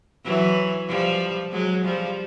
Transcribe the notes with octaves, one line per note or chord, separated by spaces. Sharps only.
E3 F#3
F3 G3
F#3 G#3
F3 G3